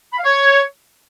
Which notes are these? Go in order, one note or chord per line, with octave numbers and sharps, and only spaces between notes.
B5
F5
C#5